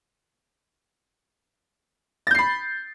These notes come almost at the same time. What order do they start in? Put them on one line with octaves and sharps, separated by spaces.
A6 G6 C7 B5